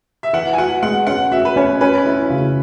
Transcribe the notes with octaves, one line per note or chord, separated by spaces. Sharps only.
E5
E3 F#5
G#5
F#4 F#5
G#3 F#5
C#4 F#5
F#4 E5
B4
C#4 C#5
C#4 B4
E4
C#3